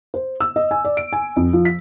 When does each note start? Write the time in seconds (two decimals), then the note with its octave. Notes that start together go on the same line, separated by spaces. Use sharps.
0.14 C5
0.40 E6
0.56 D#5
0.71 G#5
0.85 D5
0.97 D7
1.13 G#5
1.36 F2
1.53 F3
1.65 B6